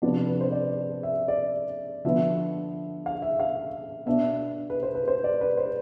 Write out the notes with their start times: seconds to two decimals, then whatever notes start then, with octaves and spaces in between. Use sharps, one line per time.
0.02 C3 F3 B3 D4 D5
0.27 B4
0.41 C5
0.52 D5
1.03 E5
1.28 D5
2.04 D3 F3 B3 E5
3.06 F5
3.22 E5
3.40 F5
4.06 B2 B3 D4 E5
4.70 B4
4.83 C5
4.95 B4
5.08 C5
5.24 D5
5.41 B4
5.57 C5